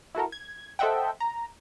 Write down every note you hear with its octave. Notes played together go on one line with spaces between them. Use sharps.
E4 F#4 A4 A#4
G#6
A4 C5 D#5 E5 F#5 G5
A#5